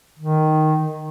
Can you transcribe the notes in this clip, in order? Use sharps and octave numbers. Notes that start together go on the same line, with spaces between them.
D#3